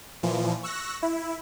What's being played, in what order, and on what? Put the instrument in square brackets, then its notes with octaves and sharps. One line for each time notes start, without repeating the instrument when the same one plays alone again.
[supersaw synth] A#2 E3 F3
C#6 E6 F#6 A#6
E4